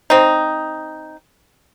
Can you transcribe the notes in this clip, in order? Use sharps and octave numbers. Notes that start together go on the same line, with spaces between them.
C4 D#4